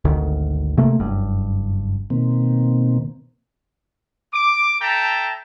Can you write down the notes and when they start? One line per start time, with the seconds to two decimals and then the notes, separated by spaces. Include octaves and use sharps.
0.05 G#1 D2 D#3
0.77 C3 A3 A#3
1.00 F#1 G2
2.10 B2 D#3 A#3 C4
4.33 D6
4.80 A4 E5 G5 A5 A#5